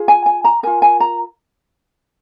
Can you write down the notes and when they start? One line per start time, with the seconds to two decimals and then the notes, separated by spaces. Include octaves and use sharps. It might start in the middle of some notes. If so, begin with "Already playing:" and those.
Already playing: F4 G#4
0.08 G#5
0.26 G#5
0.45 A#5
0.63 F4 A#4 G#5
0.82 G#5
1.00 A#5